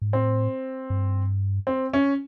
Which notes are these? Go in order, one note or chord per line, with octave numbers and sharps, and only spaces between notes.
G#2
A2 C4
G2
C4
C#4